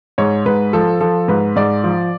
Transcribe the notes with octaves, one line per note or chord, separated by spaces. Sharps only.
G#2 C#5
G#2 B4
F3 A4
F3 A4
G#2 B4
G#2 D5
F3